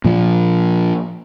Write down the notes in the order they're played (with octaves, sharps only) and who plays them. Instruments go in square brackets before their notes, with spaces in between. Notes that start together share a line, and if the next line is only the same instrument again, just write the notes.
[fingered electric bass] A#2 F3 A#3